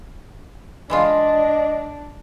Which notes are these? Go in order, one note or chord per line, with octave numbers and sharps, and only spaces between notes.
E3 G#3 D4 F4 D5 D#5